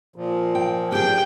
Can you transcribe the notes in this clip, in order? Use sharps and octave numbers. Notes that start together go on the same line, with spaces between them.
A#2 F3
G5
G4 G#4 G5